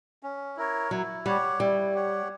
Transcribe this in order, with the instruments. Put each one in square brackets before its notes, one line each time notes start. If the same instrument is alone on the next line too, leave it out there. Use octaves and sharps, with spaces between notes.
[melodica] C#4
E4 A#4 C#5
[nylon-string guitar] F#3 [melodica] E4
[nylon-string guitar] G3 [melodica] G4 C#5 F#5
[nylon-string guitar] G3 [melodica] E4
[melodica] G4 C#5 F#5